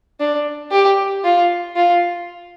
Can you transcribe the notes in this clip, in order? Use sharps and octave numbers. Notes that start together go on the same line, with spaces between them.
D4
G4
F4
F4